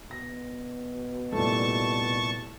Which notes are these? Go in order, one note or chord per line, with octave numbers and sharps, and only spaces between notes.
B2 A#6
C2 G2 A#2 A3 A5 C#6